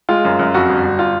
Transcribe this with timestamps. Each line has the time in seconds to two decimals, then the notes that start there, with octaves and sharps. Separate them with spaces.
0.09 G#3 F4
0.25 F#2
0.39 F#2
0.54 F2 F#4
0.69 G1
0.84 G1
0.99 F4